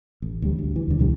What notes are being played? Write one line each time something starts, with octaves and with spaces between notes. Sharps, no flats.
A1
D2 G3
D2
E3
E2 D3
C#2 B2 D3 G3